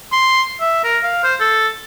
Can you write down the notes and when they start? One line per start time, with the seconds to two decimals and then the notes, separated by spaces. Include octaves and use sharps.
0.12 C6
0.60 E5
0.84 A#4
1.03 F5
1.24 C5
1.40 A4